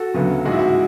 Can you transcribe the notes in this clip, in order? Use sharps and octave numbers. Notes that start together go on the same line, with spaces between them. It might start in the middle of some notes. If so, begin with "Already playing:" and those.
Already playing: F#4 A4
D2 C#3 F#3 B3
A1 G#2 G#3 F#4
E4
F#4